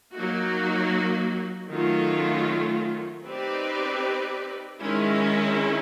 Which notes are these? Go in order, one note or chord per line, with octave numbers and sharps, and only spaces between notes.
F#3 A#3 D#4 F#4
D#3 F#3 A3 C#4 F4
C4 D#4 G4 B4 D5
D#3 G#3 C#4 E4